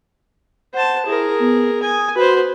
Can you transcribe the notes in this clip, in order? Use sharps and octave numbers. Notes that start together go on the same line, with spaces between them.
C5 F#5 A5
E4 G#4 A#4
B3
G#5 D#6
F#4 B4 C5